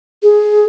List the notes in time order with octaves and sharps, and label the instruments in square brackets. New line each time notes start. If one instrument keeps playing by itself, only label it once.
[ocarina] G#4